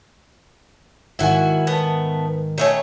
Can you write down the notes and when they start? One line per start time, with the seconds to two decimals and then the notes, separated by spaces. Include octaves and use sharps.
1.19 G#2 D#3 E4 F#4 G#5
1.67 A3 B3
2.58 D#3 A3 C#4